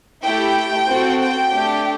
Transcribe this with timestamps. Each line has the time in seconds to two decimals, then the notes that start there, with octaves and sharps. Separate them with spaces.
0.23 A3 E4 G4 G5
0.87 C4 F#4 A4
1.20 G5
1.52 A3 D4 G4